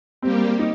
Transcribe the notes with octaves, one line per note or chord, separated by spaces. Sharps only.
G3 A#3 C4 G4
D#4